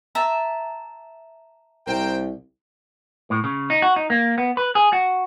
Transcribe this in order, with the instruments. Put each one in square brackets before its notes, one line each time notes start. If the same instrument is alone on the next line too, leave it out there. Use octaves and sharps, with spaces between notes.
[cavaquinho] E5 A5 A#5
[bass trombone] C2 [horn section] A#4 C5 G5
[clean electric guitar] A2
C#3
D#4
F#4
D#4
A#3
B3
B4
G#4
F#4